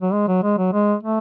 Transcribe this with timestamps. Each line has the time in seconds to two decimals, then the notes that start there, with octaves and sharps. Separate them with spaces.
0.02 F#3
0.13 G#3
0.28 F#3
0.43 G#3
0.58 F#3
0.73 G#3
1.03 A3